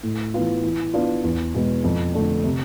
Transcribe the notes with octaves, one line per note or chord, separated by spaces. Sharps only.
A2
E3 B3 F4
E3
B3 D4 F4
E2
B2 G#3 B3
F2
D3 A3 D4
C3